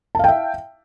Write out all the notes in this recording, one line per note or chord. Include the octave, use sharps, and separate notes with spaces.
E5 F5 G5 A5